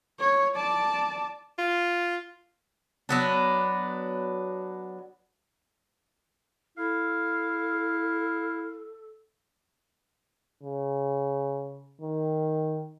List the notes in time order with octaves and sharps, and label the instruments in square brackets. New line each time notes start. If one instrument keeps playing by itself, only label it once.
[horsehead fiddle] C#5
D5 A5
[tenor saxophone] F4
[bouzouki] F#3 B3 D4
[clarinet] E4 [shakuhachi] A4 [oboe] F5
[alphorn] C#3
D#3